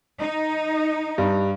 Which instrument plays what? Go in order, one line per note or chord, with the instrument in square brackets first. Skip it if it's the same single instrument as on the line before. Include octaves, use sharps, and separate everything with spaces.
[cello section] D#4
[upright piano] G2